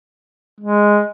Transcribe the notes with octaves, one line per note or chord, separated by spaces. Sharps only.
G#3